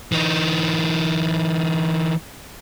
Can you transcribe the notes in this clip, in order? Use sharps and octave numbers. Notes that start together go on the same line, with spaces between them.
E3 D#4